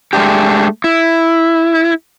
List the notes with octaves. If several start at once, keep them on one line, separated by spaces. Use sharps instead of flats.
G#3 A3 D4 G4
E4